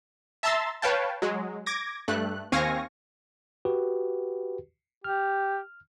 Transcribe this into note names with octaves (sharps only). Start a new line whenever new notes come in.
E5 A5 A#5 C6 E6 A6
B4 C#5 F5 G5 A5
F#3 G#3
D6 G#6 A#6
G2 A3 F#6
D#2 C4 F5 G#5 C#6 A#6
F#4 G4 B4
G4 F6